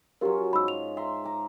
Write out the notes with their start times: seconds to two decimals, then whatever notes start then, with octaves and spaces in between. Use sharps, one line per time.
0.21 F#3 C#4 F4 G4 A#4
0.53 G#2 B5 E6
0.68 F7
0.97 E5 A#5 C6
1.24 A#5 D6